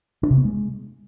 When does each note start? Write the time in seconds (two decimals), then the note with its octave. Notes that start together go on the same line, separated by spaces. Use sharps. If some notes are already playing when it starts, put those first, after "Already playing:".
0.23 D4
0.30 C3
0.38 B3
0.45 G#3